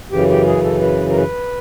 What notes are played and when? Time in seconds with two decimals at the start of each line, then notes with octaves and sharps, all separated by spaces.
0.11 F#2 C#3 E3 G4
0.29 G4
0.47 G#4
0.64 A4
0.82 B4
1.10 A#4
1.17 B4